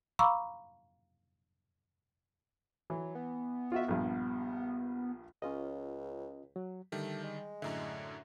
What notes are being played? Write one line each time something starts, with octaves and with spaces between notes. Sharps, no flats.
F5 A#5 B5 C#6 D6 E6
E3 F#3
B3
F4 F#4 E5
A#1 G2
C#2 C#4 F4 D#5
F#3
D3 D#3 G3 A3
G#3
F#2 A2 D3 E5 A#5